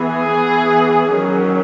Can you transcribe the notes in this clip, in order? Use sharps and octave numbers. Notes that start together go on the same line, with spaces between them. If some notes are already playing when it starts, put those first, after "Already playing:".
Already playing: E3 B3 G#4
E3 B3
D#3 F#3 C#4